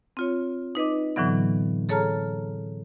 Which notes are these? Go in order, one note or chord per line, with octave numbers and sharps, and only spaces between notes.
C4 F4 C#5
D#4 B4 D#5 D6
A2 D3 E3 F#3 B3
G#4 A4 C#5 A5 A#5 F6